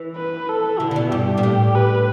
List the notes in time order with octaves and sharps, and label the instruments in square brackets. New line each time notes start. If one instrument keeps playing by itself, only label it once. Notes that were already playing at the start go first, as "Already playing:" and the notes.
Already playing: [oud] E3
[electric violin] B4
A4
[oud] D3 [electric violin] E4
[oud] D3
B2
[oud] G2 [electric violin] G4
[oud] B2
[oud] A2 [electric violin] G4
[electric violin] B4